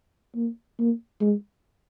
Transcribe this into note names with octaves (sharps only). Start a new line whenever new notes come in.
A#3
A#3
G#3